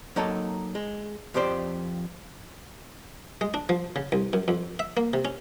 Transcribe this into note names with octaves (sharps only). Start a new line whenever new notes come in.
F#3 A#3 D#4 A4 C#5 A5
G#3
F2 F3 G4 C5 D5
G#3
D4
F3
C#3
C2
F#2
F2
E5
A#3
C3
C#4